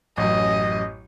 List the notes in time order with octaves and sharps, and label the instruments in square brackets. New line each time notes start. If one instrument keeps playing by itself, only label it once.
[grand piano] A1 F#2 [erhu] D#5